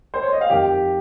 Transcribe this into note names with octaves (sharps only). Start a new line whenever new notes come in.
C5
C#5
D#5
F5
F2 D#3 G4 G5